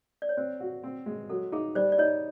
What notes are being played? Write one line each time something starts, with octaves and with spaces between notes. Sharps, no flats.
D5
C#5
C4 C5
F#4
C4
G#3
F#3 A4
D#4 G#4
G3 C5 D5
D5
D#4 C#5 D#5